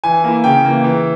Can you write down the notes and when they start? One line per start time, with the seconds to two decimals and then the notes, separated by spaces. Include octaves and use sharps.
0.04 E3 G#5
0.24 A#3 E4
0.44 C#3 G5
0.65 E3 A#3
0.84 E3